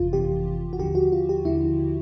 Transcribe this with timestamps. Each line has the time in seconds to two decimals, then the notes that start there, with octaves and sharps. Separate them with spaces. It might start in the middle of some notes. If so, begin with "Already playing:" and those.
Already playing: G1 F2 C3 E3 F4
0.13 G1 F2 C3 E3 G4
0.73 F#4
0.79 D#2 D3 F3 G4
0.95 F#4
1.12 F4
1.29 G4
1.45 D#2 D3 F3 E4